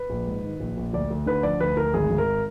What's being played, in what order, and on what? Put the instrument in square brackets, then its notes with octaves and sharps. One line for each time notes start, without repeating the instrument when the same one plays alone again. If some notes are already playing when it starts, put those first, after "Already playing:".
Already playing: [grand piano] B4
A#1
G#2
D#3
A#1
A#1
D2 D5
D2
D3 B4
F3 D5
D2 B4
D2 A#4
G#1 G#4
G#1
A#4